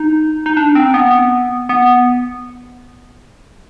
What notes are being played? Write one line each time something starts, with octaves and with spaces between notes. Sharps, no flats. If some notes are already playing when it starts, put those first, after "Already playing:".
Already playing: D#4
D#4
D4
C4
B3
B3